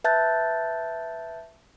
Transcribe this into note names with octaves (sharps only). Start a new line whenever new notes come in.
B4 E5 A5 F#6 G6 A6